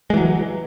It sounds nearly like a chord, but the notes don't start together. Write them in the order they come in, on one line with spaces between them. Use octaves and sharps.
G#3 E3 F#3